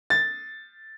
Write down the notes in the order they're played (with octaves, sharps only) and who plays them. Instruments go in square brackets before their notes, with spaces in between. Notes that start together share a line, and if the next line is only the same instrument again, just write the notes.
[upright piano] A6